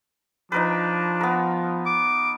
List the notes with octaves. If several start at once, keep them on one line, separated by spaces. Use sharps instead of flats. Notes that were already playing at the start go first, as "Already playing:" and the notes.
F3 D4 D#4 A#4 B4
B3 A#4
D6